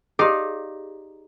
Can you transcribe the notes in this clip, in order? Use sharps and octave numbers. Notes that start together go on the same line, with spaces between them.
D#4 G4 G#4 D5 F5